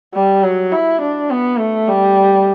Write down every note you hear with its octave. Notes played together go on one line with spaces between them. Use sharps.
G3
F#3
E4
D4
B3
A3
G3